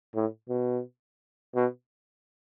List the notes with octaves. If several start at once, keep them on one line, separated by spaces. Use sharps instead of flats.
A2
B2
B2